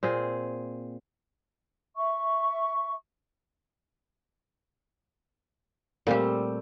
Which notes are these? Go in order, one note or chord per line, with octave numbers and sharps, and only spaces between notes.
A#2 C4 G#4
E5 C#6
A#2 G3 A3 C4 G4